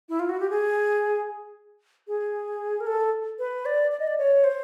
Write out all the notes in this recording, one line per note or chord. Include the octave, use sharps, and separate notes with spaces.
E4
F4
F#4
G4
G#4
G#4
A#4
A4
B4
D5
D5
D#5
D5
C#5
C5